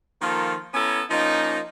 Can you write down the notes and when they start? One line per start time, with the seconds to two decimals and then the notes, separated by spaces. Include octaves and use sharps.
0.22 D#3 F3 A#3 F4 A4 A#4
0.74 B3 C#4 E4 A4 G#5 A#5
1.11 F3 A#3 C#4 D#4